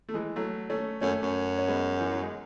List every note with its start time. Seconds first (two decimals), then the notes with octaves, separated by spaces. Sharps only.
0.09 A3
0.14 E3 G#3
0.36 F#3 A3
0.70 A3 C#4
1.01 F#2 A3 C#4
1.23 F#2
1.58 C#4
1.67 G#3 B3
2.00 E3
2.11 F#3
2.22 G#3